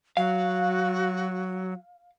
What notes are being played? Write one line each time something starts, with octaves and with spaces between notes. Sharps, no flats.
F#3 F#4 F5